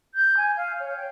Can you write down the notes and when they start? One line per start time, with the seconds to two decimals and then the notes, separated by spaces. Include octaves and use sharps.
0.14 G6
0.37 G#5
0.56 F5
0.80 C#5
0.96 G5